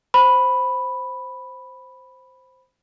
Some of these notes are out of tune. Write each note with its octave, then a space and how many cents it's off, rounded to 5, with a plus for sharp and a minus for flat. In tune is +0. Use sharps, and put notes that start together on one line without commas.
C5 +0 B5 +0